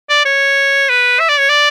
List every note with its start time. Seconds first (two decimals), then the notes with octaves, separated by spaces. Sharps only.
0.09 D5
0.25 C#5
0.89 B4
1.20 E5
1.29 D5
1.39 C#5
1.49 D5